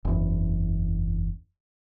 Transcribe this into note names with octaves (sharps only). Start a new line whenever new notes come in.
F#1 E2